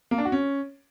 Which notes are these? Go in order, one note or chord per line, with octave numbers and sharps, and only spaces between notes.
A#3
D4
F#4
C#4